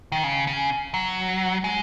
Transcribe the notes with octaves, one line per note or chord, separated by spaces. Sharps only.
D#3
C#3
C#3
F#3
G#3